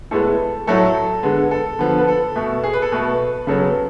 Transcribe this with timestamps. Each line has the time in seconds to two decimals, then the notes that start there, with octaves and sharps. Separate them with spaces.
0.11 A2 G#3 B3 A4
0.67 A2 F#3 A3 A4
1.23 D3 G#3 B3
1.51 A4
1.79 D3 F3 B3
1.98 B4
2.08 A4
2.36 B2 A3
2.63 G#4
2.73 B4
2.82 A4
2.92 B2 A3 B4
3.47 C#3 F#3 B3 A4